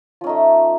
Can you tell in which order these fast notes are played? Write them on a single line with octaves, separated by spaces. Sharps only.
F3 C#4 D#4 A3